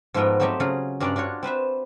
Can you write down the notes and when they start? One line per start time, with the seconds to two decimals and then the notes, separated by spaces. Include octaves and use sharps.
0.14 G#2 F3 A3 B3 A#4 G5
0.40 F#3 A3 C4 G4 D#5 E5
0.60 C#3 F#3 F4 G#4
1.00 G2 G3 C#4 D4 D5 A#5
1.16 D4 F4 F#4 C#5
1.43 C4 B4 C5 E5